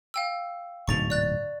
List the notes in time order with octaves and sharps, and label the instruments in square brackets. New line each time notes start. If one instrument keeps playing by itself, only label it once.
[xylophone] F5 G5 E6
[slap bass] D1 G#2 B2 [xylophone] C#6 A6 F7
[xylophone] D5 F#6 A6